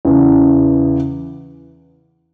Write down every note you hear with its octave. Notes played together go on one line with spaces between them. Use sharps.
E2 C#3 E3